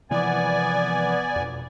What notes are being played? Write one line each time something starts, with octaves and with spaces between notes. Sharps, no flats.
C3 E3 F3 B3 D5 G#5
F2 B2